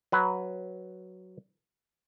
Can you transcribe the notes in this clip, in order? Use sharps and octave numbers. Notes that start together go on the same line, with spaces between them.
F#3 B4